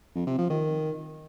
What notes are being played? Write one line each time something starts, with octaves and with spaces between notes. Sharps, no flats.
F2
C3
F3
D#3